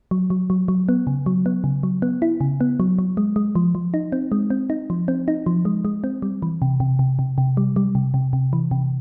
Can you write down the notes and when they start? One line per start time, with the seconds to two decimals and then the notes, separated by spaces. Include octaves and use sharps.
0.11 F#3
0.30 F#3
0.50 F#3
0.68 F#3
0.89 B3
1.07 C#3
1.26 F#3
1.46 B3
1.64 C#3
1.83 F#3
2.02 B3
2.22 E4
2.41 C#3
2.61 B3
2.80 F#3
2.99 F#3
3.17 G#3
3.36 G#3
3.55 F3
3.75 F3
3.94 D#4
4.12 C4
4.32 G#3
4.50 C4
4.70 D#4
4.90 F3
5.08 C4
5.28 D#4
5.46 F3
5.65 G#3
5.85 G#3
6.04 C4
6.22 G3
6.42 E3
6.62 C3
6.80 C3
6.99 C3
7.19 C3
7.38 C3
7.57 G3
7.76 G3
7.95 C3
8.14 C3
8.33 C3
8.53 E3
8.71 C3